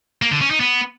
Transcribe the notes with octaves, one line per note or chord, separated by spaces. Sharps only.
A#3
D3
C#4
D#4
B3